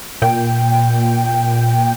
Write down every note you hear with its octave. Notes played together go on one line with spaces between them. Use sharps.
A#2 G5